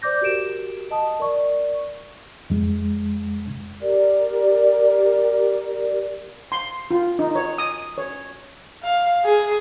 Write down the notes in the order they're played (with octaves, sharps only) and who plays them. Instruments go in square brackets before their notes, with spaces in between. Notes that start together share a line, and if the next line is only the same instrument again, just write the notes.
[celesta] C5 D5 D6 G6 A#6
F#4 G4 A#4 D7 E7
D#5 A5 D#6
A#4 D5 C#6
[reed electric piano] F2 G#3
[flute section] G4 A#4 D5
[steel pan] C6
F4
D#4
C#5
D#6
C#5
[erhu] F5
G#4